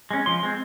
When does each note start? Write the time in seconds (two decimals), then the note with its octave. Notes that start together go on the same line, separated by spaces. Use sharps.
0.11 G#3 C#4
0.26 F3 C6
0.43 G#3 C4